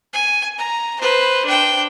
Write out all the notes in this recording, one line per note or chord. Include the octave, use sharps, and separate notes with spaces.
G#5
A#5
B4 C5
D4 G5